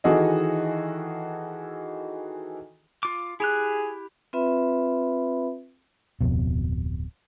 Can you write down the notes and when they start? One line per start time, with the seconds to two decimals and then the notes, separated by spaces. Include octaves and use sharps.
0.04 D#3 E3 F#4 G#4 A4 D#5
3.03 F4 D6
3.40 E4 G4 G#4 F#6
4.33 C4 F4 B4 E5 B5
6.21 D1 F2 B2